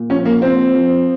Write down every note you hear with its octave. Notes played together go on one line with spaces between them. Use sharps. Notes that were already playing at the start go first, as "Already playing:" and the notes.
Already playing: A#2
F3 C#4
A#3
F3 C4
F3